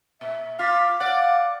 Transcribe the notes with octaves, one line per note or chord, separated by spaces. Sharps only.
A#2 E5
F4 F5 D6 B6
D5 F5 F#5